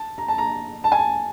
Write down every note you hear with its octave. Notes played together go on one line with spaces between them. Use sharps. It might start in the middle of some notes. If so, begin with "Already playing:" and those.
Already playing: A5
A#5
A5
A#5
A5
G#5
A5